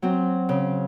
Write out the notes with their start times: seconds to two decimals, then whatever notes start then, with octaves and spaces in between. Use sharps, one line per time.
0.02 F#3 C4
0.49 C#3